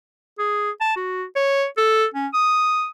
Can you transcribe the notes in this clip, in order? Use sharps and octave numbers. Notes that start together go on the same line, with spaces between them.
G#4
A5
F#4
C#5
A4
C#4
D#6